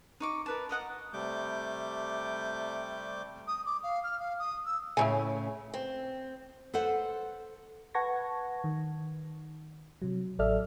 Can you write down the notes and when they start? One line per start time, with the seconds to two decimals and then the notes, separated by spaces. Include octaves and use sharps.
0.20 D#4 C#6 D6
0.46 A#4 B4 A5
0.69 A#4 D#5 F#5 D#6
1.13 C3 G3 A3 D6 G6
3.48 D#6
3.66 D6
3.83 F5
4.04 F6
4.20 F5
4.39 D#6
4.66 E6
4.97 A2 C#3 E4 E5 G#5
5.74 C4
6.73 A4 B4 C5 F#5
7.94 B4 F#5 A5 C#6 G#6 A#6
8.64 D#3
10.02 C3 F#3
10.39 A1 F#3 A4 D5 E5 F6